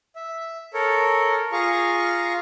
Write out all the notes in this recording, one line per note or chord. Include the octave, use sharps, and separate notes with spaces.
E5
A4 A#4 C#5
F4 G#4 F5 A#5 C#6